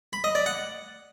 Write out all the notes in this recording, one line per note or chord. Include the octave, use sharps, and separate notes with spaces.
B5
D#5
D5
F#5